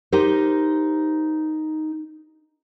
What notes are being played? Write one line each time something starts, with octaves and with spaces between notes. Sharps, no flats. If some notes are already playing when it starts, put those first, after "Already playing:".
D#4 G4 A#4 C5